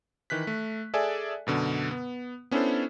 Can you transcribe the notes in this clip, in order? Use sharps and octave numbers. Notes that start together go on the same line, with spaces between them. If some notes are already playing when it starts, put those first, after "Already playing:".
D#3 E3 F#6 B6
A3
G#4 A4 D5 E5 G#5
F#2 B2 D3
B3
B3 C#4 D4 E4 A4 C5